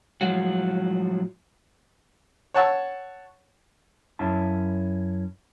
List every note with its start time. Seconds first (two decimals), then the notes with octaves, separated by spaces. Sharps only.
0.21 A2 F3 F#3 G#3 F#4
2.54 C#5 F#5 A5 C#6 E6
4.19 F#2 C#4 E4 A5